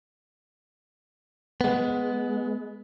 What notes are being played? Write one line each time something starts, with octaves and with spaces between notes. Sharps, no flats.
G#3 B3